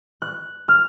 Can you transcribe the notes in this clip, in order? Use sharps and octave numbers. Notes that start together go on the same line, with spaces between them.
F#6
F6